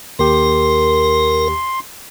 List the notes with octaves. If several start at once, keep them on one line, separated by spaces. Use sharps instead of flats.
D#2 G4 A#4 C6